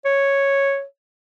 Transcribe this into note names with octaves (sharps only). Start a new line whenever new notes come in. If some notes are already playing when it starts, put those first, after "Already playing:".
C#5